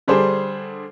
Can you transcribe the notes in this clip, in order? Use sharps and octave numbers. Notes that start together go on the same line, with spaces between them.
D3 G3 D4 G#4 C5